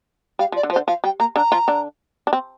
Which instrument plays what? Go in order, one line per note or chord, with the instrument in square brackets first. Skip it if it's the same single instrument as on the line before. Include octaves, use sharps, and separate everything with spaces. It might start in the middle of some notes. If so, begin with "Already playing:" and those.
[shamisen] G3 [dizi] F5
[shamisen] F3
[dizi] D5
[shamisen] D3
F3
[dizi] C5
[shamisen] D3
[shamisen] F3 [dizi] F5
[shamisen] G3 [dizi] G5
[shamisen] A#3 [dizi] A#5
[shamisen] D3 D4 [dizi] A#5
[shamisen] F3 F4
D3 D4
D4
C4